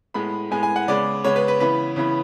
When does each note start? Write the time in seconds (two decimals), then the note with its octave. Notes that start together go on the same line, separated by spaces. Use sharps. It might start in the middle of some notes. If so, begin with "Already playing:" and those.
0.14 A2 G#3 B3 B5
0.51 A2 G#3 B3 G#5
0.63 G#5
0.76 F#5
0.88 C#3 G#3 B3 D5
1.24 C#3 G#3 B3 C#5
1.36 B4
1.48 B4
1.60 C#3 E3 B3 B4
1.96 C#3 E3 B3